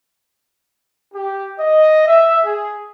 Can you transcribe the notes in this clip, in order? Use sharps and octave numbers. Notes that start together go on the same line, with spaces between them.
G4
D#5
E5
G#4